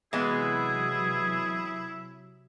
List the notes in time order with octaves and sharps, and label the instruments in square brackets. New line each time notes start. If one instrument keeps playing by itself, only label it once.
[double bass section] C3 F#3 [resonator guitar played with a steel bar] E3 G#3 B3 [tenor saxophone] E4 [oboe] G#4